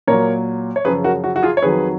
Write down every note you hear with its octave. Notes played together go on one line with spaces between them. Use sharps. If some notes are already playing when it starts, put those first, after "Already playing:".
A#2 F#3 A#4 C#5
C#5
F#2 C#3 F3 G#4 B4
F#4 A#4
F#4
F#4
F4 G#4
C#5
F2 D#3 F#3 G#4 B4